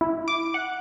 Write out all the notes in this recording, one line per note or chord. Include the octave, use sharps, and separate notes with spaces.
E4
D6
F#5